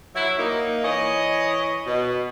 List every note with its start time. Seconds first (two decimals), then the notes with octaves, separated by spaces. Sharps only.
0.16 F#3 E4
0.38 A#3 D#4
0.84 E3 C#5 D#5
1.87 B2